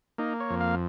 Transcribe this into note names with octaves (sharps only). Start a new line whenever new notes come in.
A#3 D#4
C#5
F2
F5